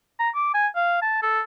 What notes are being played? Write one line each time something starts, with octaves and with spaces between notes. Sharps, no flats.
A#5
D6
G#5
F5
A5
A4